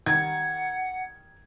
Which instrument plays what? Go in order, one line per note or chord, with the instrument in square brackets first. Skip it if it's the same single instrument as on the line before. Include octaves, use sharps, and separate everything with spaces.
[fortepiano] D#3 G3 [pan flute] F#5 [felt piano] G#6